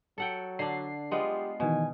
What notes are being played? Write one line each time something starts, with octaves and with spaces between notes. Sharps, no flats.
F#3 A4 F#5 G5
D3 D4 C7
G#3 B3 F4 G4
B2 D#3 E3 B3 G#5